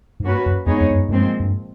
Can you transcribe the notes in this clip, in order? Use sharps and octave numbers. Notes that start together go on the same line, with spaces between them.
G#2
G2 A#3 C#4 F#4 B4
F#2
F2 G#3 B3 D#4 G#4 C#5
F2
G2
F#2
G2 A#2 F3 G#3 C4
G2